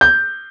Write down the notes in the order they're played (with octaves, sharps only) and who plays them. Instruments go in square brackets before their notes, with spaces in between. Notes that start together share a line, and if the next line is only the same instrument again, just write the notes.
[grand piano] G6